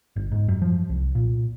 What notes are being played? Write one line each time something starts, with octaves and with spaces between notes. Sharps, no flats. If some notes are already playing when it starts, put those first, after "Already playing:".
G1
G#2
F#2
F3
C2
A#2